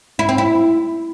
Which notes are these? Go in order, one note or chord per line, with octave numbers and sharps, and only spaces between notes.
E4
C4
E4